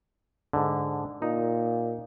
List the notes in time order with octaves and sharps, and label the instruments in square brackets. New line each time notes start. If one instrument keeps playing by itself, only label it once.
[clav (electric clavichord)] G#2 D3
[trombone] A#2 [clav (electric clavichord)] D#4